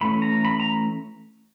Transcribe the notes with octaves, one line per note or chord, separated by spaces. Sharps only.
E3 A3 C#4 B5
A#5
B5
A#5